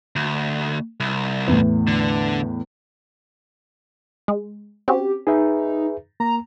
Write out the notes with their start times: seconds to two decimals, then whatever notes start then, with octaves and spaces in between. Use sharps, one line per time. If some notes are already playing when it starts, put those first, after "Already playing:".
0.16 D2
1.00 C2
1.48 E2 A2
1.88 D3
4.28 G#3
4.88 C4 C#4 F#4 G4
5.27 D#4 G#4 B4 E5
6.20 A#3 A#5